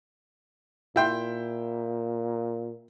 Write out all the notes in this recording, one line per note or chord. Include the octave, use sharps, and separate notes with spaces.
A#2 E4 G5 C6